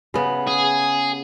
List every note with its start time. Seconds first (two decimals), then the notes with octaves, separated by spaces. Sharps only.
0.14 C#3 B3
0.47 G#4